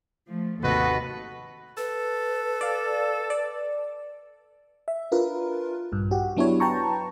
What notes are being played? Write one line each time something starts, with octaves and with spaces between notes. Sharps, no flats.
F3 A3
G#1 D#2 C3 F#4 A4 B4 D#5
A4 B4
D5 F5
D5
E5
D4 F4 A#4 B4
A#1 G2
F#4 G4
F#3 B3 D4 E4 G4 C#5
B4 G5 A5 A#5 C#6